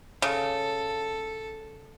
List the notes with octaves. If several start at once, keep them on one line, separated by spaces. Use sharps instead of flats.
C#3 A4